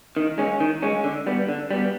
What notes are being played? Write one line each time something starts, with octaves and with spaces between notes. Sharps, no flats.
D#3
G#3 C#4
D#3
G#3 C#4
D3
G3 B3
D3
G3 B3